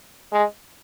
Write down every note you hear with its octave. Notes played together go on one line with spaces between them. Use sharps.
G#3